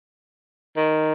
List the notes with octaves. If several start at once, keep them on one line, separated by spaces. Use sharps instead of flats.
D#3